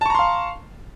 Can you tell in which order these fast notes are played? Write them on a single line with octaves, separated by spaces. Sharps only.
A5 C#6 A#5 C6 F5